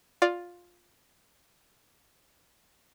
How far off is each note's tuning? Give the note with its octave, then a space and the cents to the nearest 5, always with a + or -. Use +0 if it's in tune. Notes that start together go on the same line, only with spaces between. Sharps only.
F4 +10 D5 +0